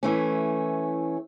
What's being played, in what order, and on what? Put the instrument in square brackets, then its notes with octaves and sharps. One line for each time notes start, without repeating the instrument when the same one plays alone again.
[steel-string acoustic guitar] E3 A3 C#4